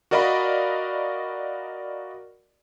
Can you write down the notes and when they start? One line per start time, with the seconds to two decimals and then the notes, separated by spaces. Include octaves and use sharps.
0.11 F#4 A#4 D5 D#5 F5 B5